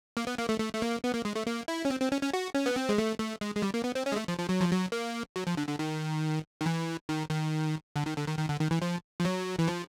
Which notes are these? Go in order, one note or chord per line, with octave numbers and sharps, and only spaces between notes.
A#3
B3
A#3
A3
A3
A3
A#3
B3
A#3
G#3
A3
A#3
E4
C#4
C4
C4
C#4
C#4
F#4
C#4
B3
C4
G#3
A3
A3
G#3
G#3
G3
A#3
B3
C4
C#4
G#3
A3
F3
F3
F#3
F3
F#3
A#3
F#3
F3
D3
D3
D#3
D#3
E3
D#3
D#3
D3
D#3
D3
D#3
D#3
D3
D#3
E3
F3
F3
F#3
E3
F3